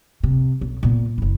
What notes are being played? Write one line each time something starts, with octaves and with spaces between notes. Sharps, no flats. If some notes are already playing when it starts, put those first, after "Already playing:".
C3
B1
A#2 B3
F#1 E4